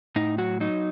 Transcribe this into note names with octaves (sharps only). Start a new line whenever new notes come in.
A2 D#4
F#3 F#4
F#3 D#4